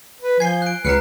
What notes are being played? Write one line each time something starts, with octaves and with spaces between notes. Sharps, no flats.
B4
F3 G#5 G6 G#6 C7
F#6 D7
C#2 B4 A#5 F6 F#6 C7 C#7